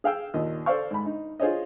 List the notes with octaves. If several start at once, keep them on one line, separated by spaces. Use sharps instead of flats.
G#4 F5 G5 E6
D#2 A#2 D#5
A4 C5 D5 F5 C#6
G#2 B5
D#4
F4 G#4 C5 C#5 D#5